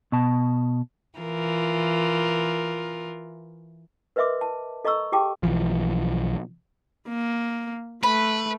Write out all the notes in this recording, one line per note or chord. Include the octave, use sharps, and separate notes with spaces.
B2 A5
E3 F4 A#4
A#4 B4 D#5 E5 C6 D6
A5
A4 D#5 A#5 C#6 E6
G4 G#4 G5 A5 D6
B1 E3 F3
A#3
A3 B4 B5